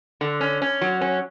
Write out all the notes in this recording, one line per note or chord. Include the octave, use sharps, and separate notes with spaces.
D3
C#4
C#4
F#3
C#4